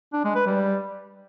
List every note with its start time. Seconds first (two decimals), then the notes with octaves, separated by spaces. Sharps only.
0.13 D4
0.24 G#3
0.35 B4
0.46 G3